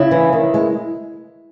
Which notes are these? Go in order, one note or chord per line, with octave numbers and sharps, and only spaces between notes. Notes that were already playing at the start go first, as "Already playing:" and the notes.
Already playing: C#3 E4
E3
D#3
G#3